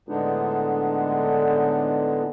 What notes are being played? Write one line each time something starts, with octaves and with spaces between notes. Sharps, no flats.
A2 D3 G#3 B3 D4 D#4